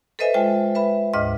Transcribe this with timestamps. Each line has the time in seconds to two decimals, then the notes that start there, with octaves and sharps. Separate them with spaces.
0.19 A4 B4 C5 D#5 E5 G#5
0.34 G#3 F4 C5 G5
0.75 B4 E5 B5
1.14 D2 G#2 D#5 D6 F6